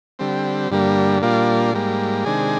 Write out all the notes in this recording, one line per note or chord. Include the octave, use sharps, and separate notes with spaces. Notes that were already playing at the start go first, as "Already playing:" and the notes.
D3 G3 C4
G2 D3 G3 A#3
A#2 G3 A#3 D4 F4
G#2 G3 A#3
C3 D#3 G#3 D4 G#4